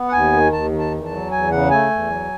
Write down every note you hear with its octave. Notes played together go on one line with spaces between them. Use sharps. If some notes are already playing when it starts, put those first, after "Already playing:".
Already playing: B3
F#5
D#2 G#5
D#3
D#2 A5
D#3
A5
E2
A5
F#3
E2 G#5
C#3 F#5
A3 G#5
E2
F#3